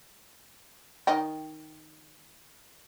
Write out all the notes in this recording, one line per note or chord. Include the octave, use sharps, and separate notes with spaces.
D#3 D#5 G5